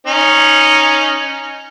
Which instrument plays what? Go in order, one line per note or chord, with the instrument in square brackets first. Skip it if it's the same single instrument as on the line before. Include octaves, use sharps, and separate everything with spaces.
[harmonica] C#4 D#4